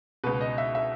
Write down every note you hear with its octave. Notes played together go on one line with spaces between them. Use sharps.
C#2 B2 B4
D#5
E5
E5